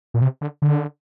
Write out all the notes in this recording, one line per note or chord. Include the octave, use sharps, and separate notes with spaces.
A#2
C3
D3
D3